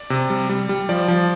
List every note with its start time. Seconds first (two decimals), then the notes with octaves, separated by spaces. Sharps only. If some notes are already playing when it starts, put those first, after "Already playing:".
Already playing: D5
0.10 C3
0.30 G3
0.49 G3
0.69 G3
0.89 F3 D5
1.08 F3